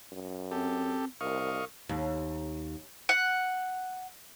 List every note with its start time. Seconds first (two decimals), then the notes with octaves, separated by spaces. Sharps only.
0.12 F#2
0.52 C4 G4 A4
1.21 C2 A#4 D#5 F5 C#6
1.89 D#2
3.09 F#5